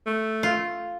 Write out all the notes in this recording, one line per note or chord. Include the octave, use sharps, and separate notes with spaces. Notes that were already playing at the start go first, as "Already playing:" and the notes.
A3
F4